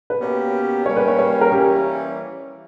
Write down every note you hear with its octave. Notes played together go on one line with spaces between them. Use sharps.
B4
B2 A#3 C#4 G4
G3 A#3 C#4 C#5
B4
C#5
C#5
A#4
E3 G3 A#3 C#4 G4